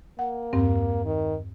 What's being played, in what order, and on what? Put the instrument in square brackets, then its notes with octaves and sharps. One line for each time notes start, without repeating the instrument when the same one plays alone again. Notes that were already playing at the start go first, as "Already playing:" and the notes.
[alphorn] A#3 [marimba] F#5
[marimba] E2 G2 C4
[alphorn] D#3